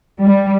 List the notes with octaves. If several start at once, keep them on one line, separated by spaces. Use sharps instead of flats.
G3